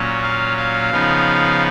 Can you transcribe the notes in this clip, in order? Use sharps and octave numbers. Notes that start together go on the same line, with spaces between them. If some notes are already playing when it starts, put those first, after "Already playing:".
Already playing: A#2 F#3 C#4
F5
F5
C#3 F3 B3 D#4